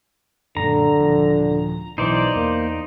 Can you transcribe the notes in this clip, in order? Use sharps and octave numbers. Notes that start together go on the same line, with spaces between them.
F#2 A#2 D3 A#5
D#1 F3
B2 E3 F#3 D#4 C5 D5
E2 A#3